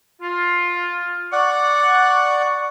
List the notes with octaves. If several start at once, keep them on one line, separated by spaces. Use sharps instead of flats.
F4
D5 F#5 C#6